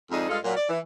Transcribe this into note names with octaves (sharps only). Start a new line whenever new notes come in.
F2 G#2 D4 D#4 G#4
G2 G#3 F4 G#4 A4 F5
A#2 F#3
D5
E3